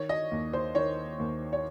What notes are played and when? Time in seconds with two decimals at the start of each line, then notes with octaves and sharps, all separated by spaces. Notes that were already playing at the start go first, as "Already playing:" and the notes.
Already playing: D#3 C#5
0.09 D#5
0.31 D#2
0.53 C5
0.75 D#3 C#5
1.19 D#2
1.53 C#5